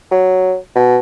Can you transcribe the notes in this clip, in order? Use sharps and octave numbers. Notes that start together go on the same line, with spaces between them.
F#3
B2